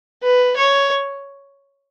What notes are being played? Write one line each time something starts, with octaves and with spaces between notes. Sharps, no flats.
B4
C#5